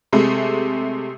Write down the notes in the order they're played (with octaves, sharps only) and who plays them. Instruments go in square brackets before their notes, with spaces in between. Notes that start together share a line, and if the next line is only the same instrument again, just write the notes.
[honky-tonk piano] C3 G#3 A3